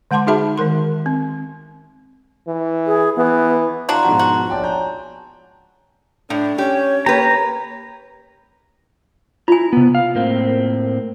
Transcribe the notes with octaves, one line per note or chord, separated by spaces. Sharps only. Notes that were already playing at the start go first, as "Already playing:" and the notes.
D3 G#3 F#5 A5 C6 D6
D#4 F#4 G#4 E5 A5 B5
D#3 G#3 A#4 C6
C4
E3
G#4
E3 B3
D4 E4 F#4 F5 A5 A#5 C6
G#2 B2 F3 F#5
F#4
A#1 C#5 D5 G5 A5
G#5 A#5 G6
A2 D4
C#4 G4 C#5
A#3 G4 B4 A#5
E4 F4 G#5 A#5
C3 B3
F5
A2 A#3 C4